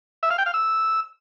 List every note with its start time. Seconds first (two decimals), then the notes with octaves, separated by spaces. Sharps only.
0.23 E5
0.30 F5
0.38 G5
0.46 F5
0.54 E6